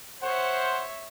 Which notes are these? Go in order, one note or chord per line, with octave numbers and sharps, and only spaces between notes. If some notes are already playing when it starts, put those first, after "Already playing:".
C5 C#5 E5 F#5